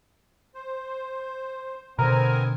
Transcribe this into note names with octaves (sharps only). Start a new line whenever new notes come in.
C5
B2 D3 B3 C4 A#4 G#5